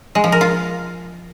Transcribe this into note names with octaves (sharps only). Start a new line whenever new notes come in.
G#3
F3
A#4
F4